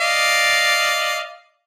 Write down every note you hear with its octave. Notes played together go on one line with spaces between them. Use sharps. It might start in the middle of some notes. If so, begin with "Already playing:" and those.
D5 D#5 F5